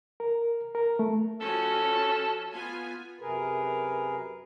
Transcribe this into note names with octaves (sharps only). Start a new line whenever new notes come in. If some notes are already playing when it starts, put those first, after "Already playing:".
A#4
A#4
A3
F3 C#4 F#4 A4
B3 F4 G#5
F#2 C3 G#4 A#4 B4